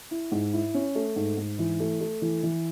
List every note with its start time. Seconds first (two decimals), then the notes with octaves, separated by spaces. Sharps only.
0.11 E4
0.32 G#2
0.53 E4
0.74 C#4
0.95 A3
1.16 G#2
1.37 G#2
1.59 E3
1.80 A3
2.01 A3
2.22 E3
2.43 E3